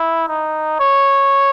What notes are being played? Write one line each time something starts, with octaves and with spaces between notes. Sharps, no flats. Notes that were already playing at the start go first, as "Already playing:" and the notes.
Already playing: E4
D#4
C#5